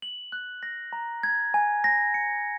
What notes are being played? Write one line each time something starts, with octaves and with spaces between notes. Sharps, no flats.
F#7
F#6
A#6
A#5
G#6
G#5
A#6
C#7